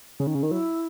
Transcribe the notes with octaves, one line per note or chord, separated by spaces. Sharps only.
C#3
D#3 C#4
C#3
C#4
D#3
F#3 E4